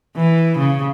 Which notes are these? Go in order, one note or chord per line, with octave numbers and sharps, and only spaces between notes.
E3
C#3